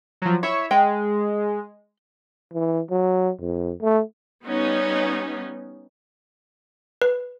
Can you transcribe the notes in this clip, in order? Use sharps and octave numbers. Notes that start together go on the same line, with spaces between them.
F3 F#3
E4 C#5 E5
G#3 G5
E3
F#3
F2
A3
G3 B3 C#4 D#4
B4